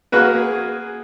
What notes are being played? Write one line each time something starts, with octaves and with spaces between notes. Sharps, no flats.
A#3 F#4 G#4 B4